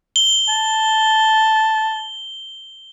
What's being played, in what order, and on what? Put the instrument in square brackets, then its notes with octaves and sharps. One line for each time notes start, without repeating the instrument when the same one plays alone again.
[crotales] G7
[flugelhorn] A5